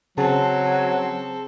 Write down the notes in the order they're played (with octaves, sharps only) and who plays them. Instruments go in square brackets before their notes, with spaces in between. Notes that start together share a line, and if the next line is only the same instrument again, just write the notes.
[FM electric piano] C#3 G#4 A5 [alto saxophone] F#3 [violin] C4 A4